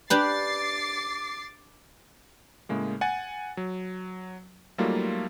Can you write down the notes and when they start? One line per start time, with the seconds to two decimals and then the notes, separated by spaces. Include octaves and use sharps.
0.10 D4 G4 B4 D6 A6 C7
2.69 A2 C#3 G#3 A#3
3.01 F#5 G#5 A6
3.57 F#3
4.78 F#3 G3 A3 A#3 D#4 F4